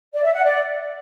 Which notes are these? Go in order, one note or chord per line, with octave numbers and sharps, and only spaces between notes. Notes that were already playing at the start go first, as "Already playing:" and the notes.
D5
E5
F#5
D5